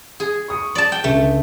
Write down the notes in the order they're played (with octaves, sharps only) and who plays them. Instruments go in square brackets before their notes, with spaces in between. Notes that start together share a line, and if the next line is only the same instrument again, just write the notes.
[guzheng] G#4
[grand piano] C#6 D#6 C#7
[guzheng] D5 A5
G5
[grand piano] C#2 D3 [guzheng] A3